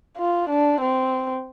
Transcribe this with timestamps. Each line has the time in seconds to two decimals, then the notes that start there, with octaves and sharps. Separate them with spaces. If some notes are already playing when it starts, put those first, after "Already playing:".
0.18 F4
0.49 D4
0.81 C4